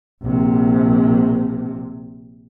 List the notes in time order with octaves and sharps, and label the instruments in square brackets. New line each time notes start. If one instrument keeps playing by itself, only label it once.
[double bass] A#1 C3